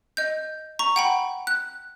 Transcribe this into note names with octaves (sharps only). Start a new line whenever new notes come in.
D#5 G6
A#5 C#6
F#5 G5 B5
F#6